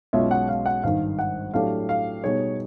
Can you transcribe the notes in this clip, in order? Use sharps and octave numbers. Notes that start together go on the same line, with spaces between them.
B1 B2 G#3 C#4 F4 E5
F#5
F5
F#5
G#1 G2 D#3 F5
F#5
A2 F#3 A3 D4 G4 F5
F5
B2 G3 B3 D#4 G#4 C#5